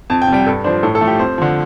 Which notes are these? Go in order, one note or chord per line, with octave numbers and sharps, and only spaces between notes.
F2 A5
G5
C3
G3 G5
G2 A4
F3 D4 C5
A2 A4
A4
F3 A3
G4
F2 C5
D3 F3